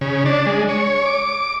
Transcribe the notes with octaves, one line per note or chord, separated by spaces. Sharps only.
C#3
D4
G#3
C#5
D6